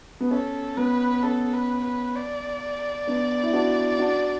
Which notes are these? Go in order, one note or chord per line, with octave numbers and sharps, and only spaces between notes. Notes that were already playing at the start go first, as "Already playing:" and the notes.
B3
C#4 A4
B3 B4
C#4 A4
B4
B4
D5
B3 D4
E4
D4 F#4
D4 F#4